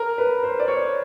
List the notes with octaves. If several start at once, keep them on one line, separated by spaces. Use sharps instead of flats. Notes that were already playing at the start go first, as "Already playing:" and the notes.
Already playing: A#4
B4
C5
D5
C#5